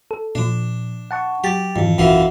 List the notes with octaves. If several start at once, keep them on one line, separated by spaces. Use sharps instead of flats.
A4
A#2 F3 D4
F#5 A5 C#6
F#3 G4 A6
F2 G#2 D#3 E3
A#1 F#2 E3 F4